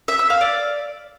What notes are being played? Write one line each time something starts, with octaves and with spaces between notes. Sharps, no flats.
E5
E6
F5
D5